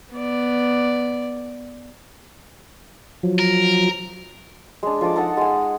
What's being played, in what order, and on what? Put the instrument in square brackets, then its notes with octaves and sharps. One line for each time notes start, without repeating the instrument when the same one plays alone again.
[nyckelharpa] B3 D5
[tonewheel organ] F3 F#3
[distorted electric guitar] A#4
[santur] G#3 D4
F3 A4 D#5 D6
D#4 A4 F#5
G#3 G#5